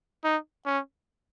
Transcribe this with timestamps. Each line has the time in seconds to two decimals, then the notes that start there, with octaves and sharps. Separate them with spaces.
0.24 D#4
0.66 C#4